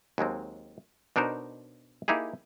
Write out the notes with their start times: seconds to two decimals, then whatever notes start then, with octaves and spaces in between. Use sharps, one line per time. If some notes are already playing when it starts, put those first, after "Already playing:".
0.18 D#2 F#3 G#3 C4
1.16 B2 D4 D#4 A#4 C5
2.08 A#3 D#4 E4 G4 G#4